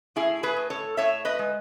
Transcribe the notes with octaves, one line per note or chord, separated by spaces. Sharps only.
A2 E4 G#4
G#4 B4
A2
A4 C#5
A2 C#5 E5
B4 D#5
G#3